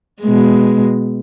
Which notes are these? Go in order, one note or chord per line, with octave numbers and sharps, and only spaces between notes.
B2 G#3